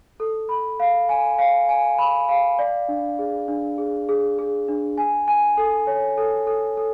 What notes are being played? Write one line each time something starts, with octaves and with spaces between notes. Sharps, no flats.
A4
B5
F5
G#5
F5
G#5
B5
F5
D5
D4
G#4
D4
G#4
G#4
G#4
D4
G#5
G#5
A4
C#5
A4
A4
A4